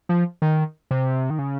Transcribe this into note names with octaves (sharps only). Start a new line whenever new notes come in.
F3
D#3
C3
D#3
C#3